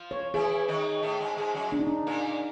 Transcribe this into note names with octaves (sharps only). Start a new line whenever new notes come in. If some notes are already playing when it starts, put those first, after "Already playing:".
Already playing: F3 F4
C#5
E3 E4 G#4
D#3 D#4
A2 A3
G#2 G#3
G#2 G#3
F#2 F#3
D4
D#4
D4
A#2 A#3